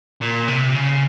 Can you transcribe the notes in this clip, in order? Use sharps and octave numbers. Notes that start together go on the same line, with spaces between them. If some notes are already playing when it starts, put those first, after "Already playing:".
A#2
C3
C#3